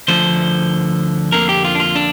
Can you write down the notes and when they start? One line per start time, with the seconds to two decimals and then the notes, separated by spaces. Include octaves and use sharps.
0.08 D2 D3 F3 C5
1.32 F2 D3 A#3 A#4
1.49 G4
1.65 F4
1.75 D4
1.80 F4
1.96 D4